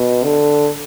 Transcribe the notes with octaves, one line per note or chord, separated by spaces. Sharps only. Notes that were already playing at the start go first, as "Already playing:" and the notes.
Already playing: B2
D3